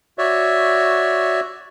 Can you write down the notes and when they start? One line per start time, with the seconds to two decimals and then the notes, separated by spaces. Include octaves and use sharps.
0.18 F#4 C#5 D5 E5